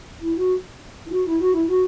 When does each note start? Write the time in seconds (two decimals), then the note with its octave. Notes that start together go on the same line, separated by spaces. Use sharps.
0.20 E4
0.36 F#4
1.06 E4
1.10 F#4
1.25 E4
1.39 F#4
1.53 E4
1.67 F#4